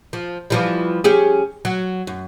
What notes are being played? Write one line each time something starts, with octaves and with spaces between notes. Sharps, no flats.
F3
E3 F3 G3
C#4 G4 G#4
F#3
F#2